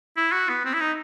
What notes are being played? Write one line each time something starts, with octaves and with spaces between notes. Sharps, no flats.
E4
F#4
B3
C4
E4
D#4